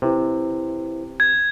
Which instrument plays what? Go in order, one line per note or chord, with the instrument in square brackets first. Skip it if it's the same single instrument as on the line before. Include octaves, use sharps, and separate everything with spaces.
[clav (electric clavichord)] C3 [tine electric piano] E4 B4 C5
[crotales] G#6